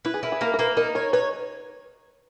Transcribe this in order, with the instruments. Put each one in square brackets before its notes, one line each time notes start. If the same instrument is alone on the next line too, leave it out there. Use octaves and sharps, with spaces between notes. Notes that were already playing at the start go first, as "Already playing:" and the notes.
[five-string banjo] E4 [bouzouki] B4
[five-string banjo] G#4
[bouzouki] E4 [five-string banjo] A#4
[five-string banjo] G#4
[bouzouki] A#3 [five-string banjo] A#4
[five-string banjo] A#4
[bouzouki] A#3 [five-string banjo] B4
[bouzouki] D#4 [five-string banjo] A#4
[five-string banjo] A#4 [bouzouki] C#5
[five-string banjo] B4 [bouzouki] C#5